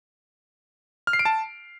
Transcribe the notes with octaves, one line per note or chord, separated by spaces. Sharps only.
F6
C7
D7
A5